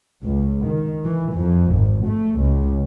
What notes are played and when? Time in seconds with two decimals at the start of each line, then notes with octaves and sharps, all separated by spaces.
0.24 C#2
0.66 D#3
1.05 E3
1.35 F2
1.74 G#1
2.08 A3
2.40 C#2